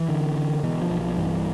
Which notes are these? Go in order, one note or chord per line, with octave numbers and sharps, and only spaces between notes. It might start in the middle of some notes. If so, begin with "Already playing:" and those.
Already playing: E3
D3
D3
B2 E3
F3
B1
F3
G2 E3